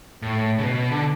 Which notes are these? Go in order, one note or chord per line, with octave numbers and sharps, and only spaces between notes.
A2
C#3
B2
D3